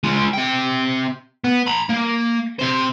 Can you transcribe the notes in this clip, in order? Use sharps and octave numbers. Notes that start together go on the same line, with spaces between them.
G#3 F4
C3 G5
B3
A#5 B5
A#3
C3 C5